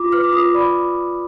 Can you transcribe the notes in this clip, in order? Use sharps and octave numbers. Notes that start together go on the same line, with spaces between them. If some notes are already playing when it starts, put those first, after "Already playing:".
Already playing: F4 D6
B4 F6
D6
F4 D#6
D5 B5